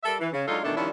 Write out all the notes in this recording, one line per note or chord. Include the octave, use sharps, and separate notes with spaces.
G3 A4 A#4 E5
E3
C#3
F#3 G#3 D4 D#4 F4 A4
B2 D#3 E3 A3 D4
D#3 F3 G3 C#4 D4 E4